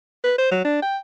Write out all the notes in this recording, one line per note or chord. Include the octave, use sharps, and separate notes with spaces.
B4
C5
F#3
D4
G5